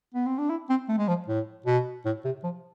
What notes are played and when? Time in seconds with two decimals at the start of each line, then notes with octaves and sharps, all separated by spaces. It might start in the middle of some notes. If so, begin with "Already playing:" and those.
0.15 B3
0.26 C4
0.38 D4
0.50 E4
0.69 C4
0.89 A3
0.98 G#3
1.08 F3
1.28 A2
1.66 B2
2.05 A2
2.25 C3
2.43 F3